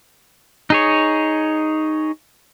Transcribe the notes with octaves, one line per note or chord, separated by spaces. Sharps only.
D#4 G#4 C#5